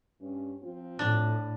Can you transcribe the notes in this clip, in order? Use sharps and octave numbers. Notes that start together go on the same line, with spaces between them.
G2 C#4
F3 C4 F4
A2 D4